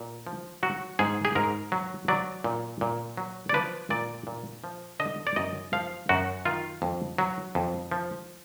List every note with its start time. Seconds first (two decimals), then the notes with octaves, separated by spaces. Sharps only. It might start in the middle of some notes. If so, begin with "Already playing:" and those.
Already playing: A#2
0.27 F3
0.63 F#3 F#4
0.99 G#2 G#4
1.25 G#4
1.35 G#2 A#4
1.72 F#3
2.08 F#3 D5
2.44 A#2
2.81 A#2
3.17 F#3
3.49 D5
3.54 F3 B4
3.90 A#2 D5
4.27 A#2
4.64 F3
5.00 D3 D#5
5.27 D5
5.36 F#2 D#5
5.73 F3 F5
6.09 F#2 F#4
6.45 D#3 F4
6.82 F2
7.18 F#3
7.55 F2
7.91 F3